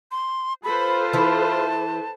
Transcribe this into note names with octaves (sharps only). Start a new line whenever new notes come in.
C6
F4 A4 B4 C5 B5
E3 E4 A5